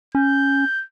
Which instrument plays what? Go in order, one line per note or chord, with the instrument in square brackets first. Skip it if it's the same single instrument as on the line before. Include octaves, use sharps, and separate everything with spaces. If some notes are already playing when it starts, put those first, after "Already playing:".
[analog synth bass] C#4 [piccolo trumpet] G6